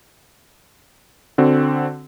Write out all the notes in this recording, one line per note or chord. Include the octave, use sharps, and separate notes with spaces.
D3 C4 F#4